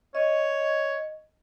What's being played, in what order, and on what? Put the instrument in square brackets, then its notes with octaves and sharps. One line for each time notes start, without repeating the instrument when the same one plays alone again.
[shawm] C#5 [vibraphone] D#5